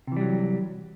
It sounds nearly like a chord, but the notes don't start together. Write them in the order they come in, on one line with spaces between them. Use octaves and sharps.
C3 E3 G3 F#3